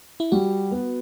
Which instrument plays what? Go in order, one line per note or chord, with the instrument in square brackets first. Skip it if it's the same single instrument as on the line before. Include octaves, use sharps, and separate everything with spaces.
[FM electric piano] E4
[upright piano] G3 [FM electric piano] F#4
[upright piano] B3